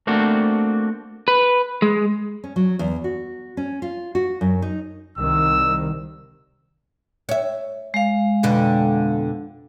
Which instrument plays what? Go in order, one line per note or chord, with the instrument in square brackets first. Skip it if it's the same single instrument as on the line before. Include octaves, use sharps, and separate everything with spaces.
[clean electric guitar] A3 A#3 C4 D4 F#4
[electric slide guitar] B4
G#3
[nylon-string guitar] C#4
F#3
E2
F#4
C#4
F4
F#4
F#2
D#4
[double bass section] C2 D#3 [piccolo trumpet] E6
[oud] C#5 E5
[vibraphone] G#3 F5
[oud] F2 B2 D3